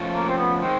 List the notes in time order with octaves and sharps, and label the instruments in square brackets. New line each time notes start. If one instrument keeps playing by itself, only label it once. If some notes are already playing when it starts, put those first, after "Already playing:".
Already playing: [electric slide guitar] F3 A3 C#4 F4 A4
[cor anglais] A#3
C4
B3
[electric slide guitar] D#3 G#3 [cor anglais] C4